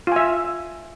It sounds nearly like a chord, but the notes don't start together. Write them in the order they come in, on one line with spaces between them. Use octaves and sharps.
F4 G#5 E5